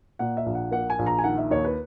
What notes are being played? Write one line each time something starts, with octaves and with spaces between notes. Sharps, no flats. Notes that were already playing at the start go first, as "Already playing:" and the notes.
A#2 F#5
E5
A#1
F#5
A#3 F#5
G#5
A#1
A#5
G#5
D#3 F#5
E5
D#2 C#5
B4